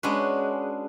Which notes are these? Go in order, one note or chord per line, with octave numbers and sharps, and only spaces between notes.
G#3 C#4 D4 F#4 B4